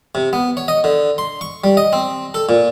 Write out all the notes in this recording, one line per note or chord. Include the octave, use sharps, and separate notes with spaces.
C3
B3
C#5
D#5
D3
C6
C#6
G3
D#5
C4
A4
A#2